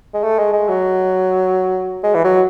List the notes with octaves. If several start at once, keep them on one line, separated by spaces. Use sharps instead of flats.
G#3
A3
G#3
G#3
F#3
G#3
E3
F#3